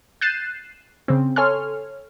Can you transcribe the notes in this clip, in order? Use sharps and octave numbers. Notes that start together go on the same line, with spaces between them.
F#6 G6 A6 C7 D#7 E7
C#3 C4
A4 C#5 G#5 C6 F6